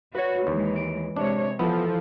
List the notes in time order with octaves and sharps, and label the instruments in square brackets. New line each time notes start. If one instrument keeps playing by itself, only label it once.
[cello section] F#4 [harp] B4 C#5
[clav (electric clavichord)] D#2 [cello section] E3 G#3
[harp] D7
[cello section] C3 G#3 C#5 [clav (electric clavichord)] D4
[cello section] E3 [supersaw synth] F3 [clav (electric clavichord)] B3 [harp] E4 A4